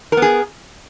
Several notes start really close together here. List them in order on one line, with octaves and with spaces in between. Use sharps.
A#4 B3 G#4